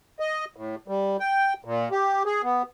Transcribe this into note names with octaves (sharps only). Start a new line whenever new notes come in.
D#5
A2
G3
G5
A#2
G4
G#4
B3